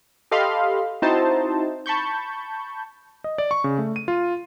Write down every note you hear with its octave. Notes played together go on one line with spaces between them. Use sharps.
G4 A4 D#5 F5 B5 C6
C4 D#4 E4 F#4 C5 A5
A5 B5 C#6 G6
D#5
D5
C#6
C#3
A3
D#7
F4